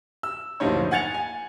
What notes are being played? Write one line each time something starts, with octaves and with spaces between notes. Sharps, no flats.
E6
D1 A#1 G2 D#4 C5 C#5
F#5 G#5 G#6 A6 C#7 F7
G#5